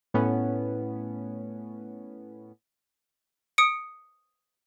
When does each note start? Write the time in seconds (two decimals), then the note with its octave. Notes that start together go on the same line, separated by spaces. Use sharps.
0.14 A2 B3 C#4
3.58 D#6 C#7 D7